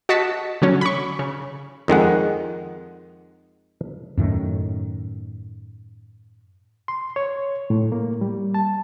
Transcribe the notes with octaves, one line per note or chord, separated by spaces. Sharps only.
F#4 D#5 A5 A6 B6 C#7
D3 F#3 C#4
B5 C#6
C#3
F2 D#3 G#3 F#5
F#2 A2 D#3
C6
C#5
A2
A#3
G3
A5